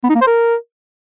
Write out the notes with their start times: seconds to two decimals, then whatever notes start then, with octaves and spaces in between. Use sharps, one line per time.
0.04 B3
0.09 D#4
0.15 A#3
0.21 C5
0.27 A#4